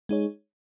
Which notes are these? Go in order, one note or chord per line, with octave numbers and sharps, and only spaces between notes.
G#3 D#4 G#4 C#5